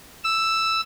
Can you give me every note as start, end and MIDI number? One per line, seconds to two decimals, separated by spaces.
0.24 0.81 88